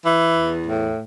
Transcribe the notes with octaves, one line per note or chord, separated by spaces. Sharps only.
E3
E2
A2